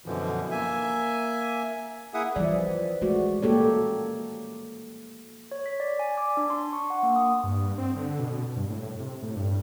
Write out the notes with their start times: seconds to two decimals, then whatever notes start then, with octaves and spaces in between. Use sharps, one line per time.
0.06 F#2 B2 D3 E3 F3
0.51 A#3 E5 G#5
2.14 A#3 E4 G#4 E5 F#5 D#6
2.36 E3 F3 G3 D5 E5
3.02 G#3 A3 F#4 D5
3.42 A#3 G4 A4 C#5
5.51 C#5
5.66 B6
5.80 D5
5.99 G#5
6.17 D6
6.37 D4
6.50 C6
6.73 C#6
6.90 F#5
7.03 A#3
7.16 D#6
7.44 G2
7.78 C4
7.96 D3
8.19 B2
8.57 G2
8.69 A2
8.82 A2
8.99 C3
9.22 A2
9.36 G2